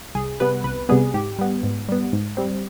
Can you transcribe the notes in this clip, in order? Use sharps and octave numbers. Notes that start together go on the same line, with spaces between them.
C2 G#4
C3 G3 B3 B4
C2 B4
C3 G3 B3 G#4
G#2 G4
G3 B3
G#2
G3 B3
G#2
G3 C4